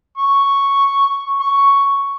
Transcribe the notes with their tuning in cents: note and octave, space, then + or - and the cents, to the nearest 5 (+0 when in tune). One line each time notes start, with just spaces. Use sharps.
C#6 +0
C#6 +5